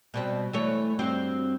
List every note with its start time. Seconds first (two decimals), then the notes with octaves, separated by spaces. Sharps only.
0.14 B2 G3 C4
0.53 E3 A3 C#5
0.99 G2 C4 F#4